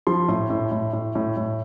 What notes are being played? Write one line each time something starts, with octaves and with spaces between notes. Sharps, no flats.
F3 C6
A2
A2
A2
A2
A2
A2